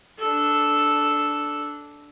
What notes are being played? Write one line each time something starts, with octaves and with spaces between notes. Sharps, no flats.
D4 A4